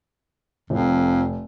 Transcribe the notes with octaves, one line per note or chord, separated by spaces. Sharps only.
F1 F2